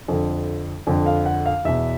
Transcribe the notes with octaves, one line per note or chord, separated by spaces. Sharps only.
F2 D3
F2 D3
F5
F#5
F5
E2 B2 E5